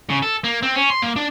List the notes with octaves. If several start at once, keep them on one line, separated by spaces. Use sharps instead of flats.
C#3
A4
A#3
C4
C#4
C6
A#3
D4